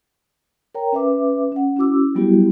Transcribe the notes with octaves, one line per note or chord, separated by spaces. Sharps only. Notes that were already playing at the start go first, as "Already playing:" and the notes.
A#4 C#5 G5 A#5
C#4 B4 E5 D6
C#4 F#5
C#4 E4 F#4 D6 E6
F#3 G3 B3 E4 F#4 G4